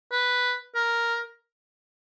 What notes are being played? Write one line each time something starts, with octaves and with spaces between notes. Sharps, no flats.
B4
A#4